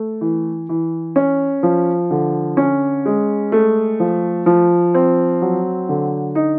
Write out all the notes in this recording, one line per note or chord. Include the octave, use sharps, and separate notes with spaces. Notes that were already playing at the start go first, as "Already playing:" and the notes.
Already playing: A3
E3
E3
C#4
F3
D3
C#4
G#3
A3
F3
F3
C4
F#3
D3
D#4